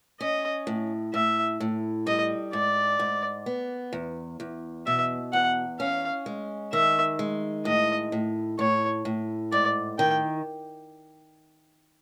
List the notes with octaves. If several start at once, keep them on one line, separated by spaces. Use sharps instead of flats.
C#4 D#5
A2
A2 E5
A2
G3 D#5
G#2 D5
G#2
B3
E2
E2
B2 E5
E2 F#5
C#4 F5
G#3
D#3 E5
G#3
A2 D#5
A2
A2 C#5
A2
G#2 D5
D#3 G5